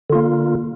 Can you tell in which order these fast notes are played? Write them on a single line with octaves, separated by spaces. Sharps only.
D3 F4 A#3